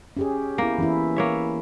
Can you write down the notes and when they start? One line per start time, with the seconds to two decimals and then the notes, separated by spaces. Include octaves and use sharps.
0.17 C#4 G4 G#4
0.58 A#3 B3 E4
0.78 E3 C#4 E4
1.16 A#3 C#5 E5